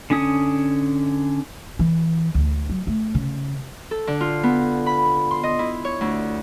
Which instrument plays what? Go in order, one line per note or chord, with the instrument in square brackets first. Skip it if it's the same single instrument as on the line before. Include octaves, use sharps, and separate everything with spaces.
[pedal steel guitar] D3 C#4 D#6
[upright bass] E3
D2
F#3
A3
C#3
[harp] A4
D3
F4
B3
B5
C6
D#5
E4
C#5
D2